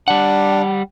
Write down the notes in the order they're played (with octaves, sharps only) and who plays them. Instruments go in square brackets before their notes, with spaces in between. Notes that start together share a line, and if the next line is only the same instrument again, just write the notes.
[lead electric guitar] G3 F#5 [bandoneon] D4